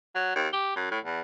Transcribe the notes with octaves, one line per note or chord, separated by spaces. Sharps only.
F#3
D#2
G4
F#2
A2
E2